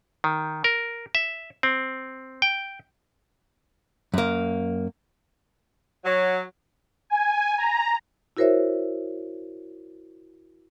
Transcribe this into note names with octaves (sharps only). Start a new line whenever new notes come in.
D#3
A#4
E5
C4
G5
F#2 A#3
F#3
G#5
A#5
E4 F#4 A#4 C5 C#5 E5